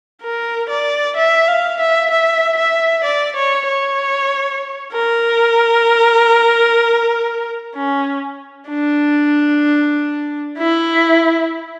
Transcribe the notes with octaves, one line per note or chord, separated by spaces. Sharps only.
A#4
D5
E5
F5
E5
E5
E5
D5
C#5
C#5
A#4
C#4
D4
E4